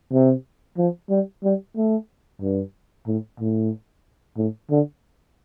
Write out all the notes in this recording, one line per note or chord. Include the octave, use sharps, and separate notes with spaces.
C3
F3
G3
G3
A3
G2
A2
A2
A2
D3